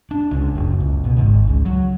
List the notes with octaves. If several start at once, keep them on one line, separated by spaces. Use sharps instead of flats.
D4
C#2
F#1
C#2
B2
G#1
C#2
F#3